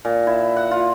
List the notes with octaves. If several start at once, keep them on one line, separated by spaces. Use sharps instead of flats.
A#2
E4
F#5
F4